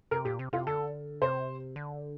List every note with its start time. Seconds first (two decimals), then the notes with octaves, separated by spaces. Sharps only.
0.11 C3 A#4
0.25 A#2 G4
0.39 C3
0.53 C3 F4
0.67 D3 A4
1.22 C3 C5
1.76 D3